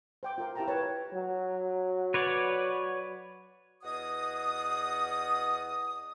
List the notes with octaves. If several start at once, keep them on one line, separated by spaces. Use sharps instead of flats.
C5 G5 D6
F4 A#4 F5
E4 G4 A#4 G5 A5 A#5
A#4 B4 C#5 A5
F#3
B4 C#5 D5
E2 F#4 D#5 D#6